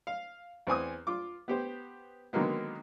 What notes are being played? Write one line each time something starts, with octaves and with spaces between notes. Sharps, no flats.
F5
E2 C4 G#5 D#6
F4 D6
B3 G4 C5
D3 D#3 F#3 G#3 A#3 B3